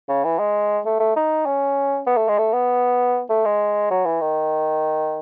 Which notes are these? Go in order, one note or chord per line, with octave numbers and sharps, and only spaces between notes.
C#3
E3
G#3
A3
A3
D#4
C#4
B3
A3
G#3
A3
B3
A3
G#3
F#3
E3
D#3